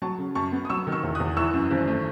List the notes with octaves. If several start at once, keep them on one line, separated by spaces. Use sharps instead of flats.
F#3 A5 C#6
C#3
F#2 A5 C#6
B3
D#6
F#3 C#6 E6
D#3
C#6 E6
E2
D#6 F#6
E2
E3 C#6 E6
F#2
G#1
A3